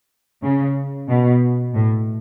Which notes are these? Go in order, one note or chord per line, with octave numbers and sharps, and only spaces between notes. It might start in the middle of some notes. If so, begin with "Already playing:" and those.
C#3
B2
A2